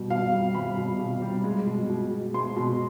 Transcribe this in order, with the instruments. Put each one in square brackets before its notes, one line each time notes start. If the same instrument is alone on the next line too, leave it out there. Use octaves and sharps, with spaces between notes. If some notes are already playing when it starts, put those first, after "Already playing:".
Already playing: [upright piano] B2 G3
B2 F5
G3
G3 B5
B2
B2
G3
G#3
B2
B2
G#3
G#3 C6
B2